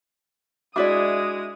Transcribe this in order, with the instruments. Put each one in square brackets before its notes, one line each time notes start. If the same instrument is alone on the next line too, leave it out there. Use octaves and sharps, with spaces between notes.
[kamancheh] G#3 D#6 [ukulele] D4 E4 D5 [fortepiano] F#4 E5 D6